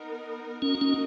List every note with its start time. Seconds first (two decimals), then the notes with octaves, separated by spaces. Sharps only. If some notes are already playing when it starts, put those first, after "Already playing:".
Already playing: B3 D#4 A#4
0.62 A#3 C#4 D#4 F#4 A#4 D#5
0.81 C#4